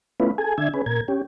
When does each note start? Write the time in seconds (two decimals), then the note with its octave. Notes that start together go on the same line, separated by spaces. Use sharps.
0.20 A3 B3 C#4 E4 F4 B4
0.38 G#4 A4 G#5
0.58 D3 D4 E5 G#6
0.74 C#4 G#4 B4
0.86 A#2 A#4 G#6
1.08 C#4 G4